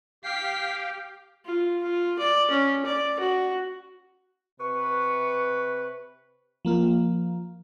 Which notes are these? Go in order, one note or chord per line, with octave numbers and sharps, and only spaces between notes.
G4 F5 G5 B6 C7
F4
F4
D5
C#4
D5
F#4
C3 B4 C#6
F3 A#3 F4